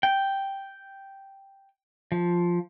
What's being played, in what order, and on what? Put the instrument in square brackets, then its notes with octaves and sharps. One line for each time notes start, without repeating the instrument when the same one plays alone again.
[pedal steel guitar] G5
F3